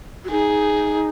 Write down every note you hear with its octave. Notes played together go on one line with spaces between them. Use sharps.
F#4
D#4 G#4